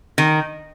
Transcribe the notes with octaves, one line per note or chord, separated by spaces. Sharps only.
D#3